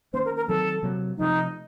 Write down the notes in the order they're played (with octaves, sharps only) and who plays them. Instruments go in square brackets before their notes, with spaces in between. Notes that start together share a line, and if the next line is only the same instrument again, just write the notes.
[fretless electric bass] D#3 A#3 C#4 [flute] C5
[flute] A#4
A#4
[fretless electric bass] D#3 F#3 C4 [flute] A4
[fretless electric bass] C3 F#3 A#3
[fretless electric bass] C3 F3 A3 [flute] D#4